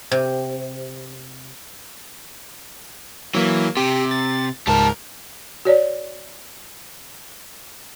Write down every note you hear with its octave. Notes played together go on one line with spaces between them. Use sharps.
C3
E3 F#3 A#3
C3 G4
A6
C#2 G#2 G3 A#4 A5
F#4 C#5 D5